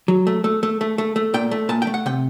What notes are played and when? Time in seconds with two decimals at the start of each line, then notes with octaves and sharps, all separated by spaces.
0.08 F#3
0.27 A3
0.44 A3
0.63 A3
0.81 A3
0.98 A3
1.16 A3
1.34 A#2 G5
1.51 A3
1.69 A#2 A5
1.82 G5
1.87 A3
1.94 F#5
2.06 C3 G5